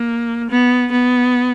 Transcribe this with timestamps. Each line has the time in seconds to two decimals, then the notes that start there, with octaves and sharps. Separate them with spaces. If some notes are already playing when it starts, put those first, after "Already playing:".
Already playing: A#3
0.50 B3
0.92 B3